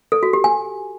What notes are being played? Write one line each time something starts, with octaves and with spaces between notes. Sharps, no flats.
A4
F#4
G4
G#5